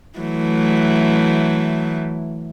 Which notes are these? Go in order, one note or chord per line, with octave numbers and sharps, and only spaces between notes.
E3 F#3 A3